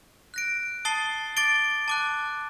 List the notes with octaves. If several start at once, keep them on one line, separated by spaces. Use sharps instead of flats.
F#6 A#6 D7
A5 D#6 A6 C7 G7
D6 A6 D7 G7
A5 D6 F#6